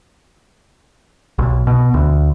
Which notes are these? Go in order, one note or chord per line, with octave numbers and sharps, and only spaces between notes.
B1
B2
D2